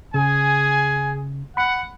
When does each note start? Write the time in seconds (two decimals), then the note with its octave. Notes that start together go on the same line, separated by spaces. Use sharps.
0.14 C#3 G#4 G#5
1.57 F#5 B5 C#7